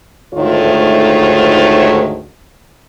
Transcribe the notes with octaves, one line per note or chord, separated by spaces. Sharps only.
D2 G#2 D#3 A3 F4 C#5